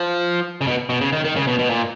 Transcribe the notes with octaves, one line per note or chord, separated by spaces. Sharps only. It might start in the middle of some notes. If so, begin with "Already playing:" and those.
Already playing: F3
C#3
B2
B2
C#3
D#3
D#3
C#3
B2
B2
A#2